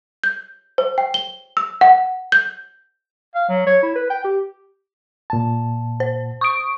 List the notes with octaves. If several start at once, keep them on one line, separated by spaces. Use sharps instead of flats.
G6
C5
G5
G7
E6
F#5
G6
F5
F#3
C#5
E4
B4
G5
G4
A#2 A5
C5
C#6 D#6 D7